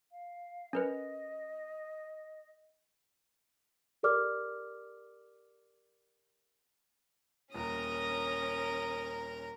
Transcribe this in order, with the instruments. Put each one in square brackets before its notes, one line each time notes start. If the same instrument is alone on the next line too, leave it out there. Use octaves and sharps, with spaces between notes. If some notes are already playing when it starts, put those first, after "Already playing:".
[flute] F5
[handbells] C#4 A#4 B4 [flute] D#5
[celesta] G4 A4 A#4 D5 D6 F6
[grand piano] D#1 [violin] C#4 [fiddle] A#4 A#5 [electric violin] D#6